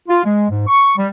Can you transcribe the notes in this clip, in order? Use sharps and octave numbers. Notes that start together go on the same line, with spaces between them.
F4
G#3
G#2
C#6
G3